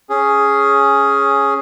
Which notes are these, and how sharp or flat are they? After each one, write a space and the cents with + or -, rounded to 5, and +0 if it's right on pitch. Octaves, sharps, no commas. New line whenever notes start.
C#4 +0 G#4 +5